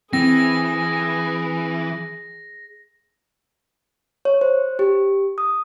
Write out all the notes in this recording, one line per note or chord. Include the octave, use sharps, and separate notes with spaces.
E3 C4 G#4 A#6
C#5
C5
G4
D#6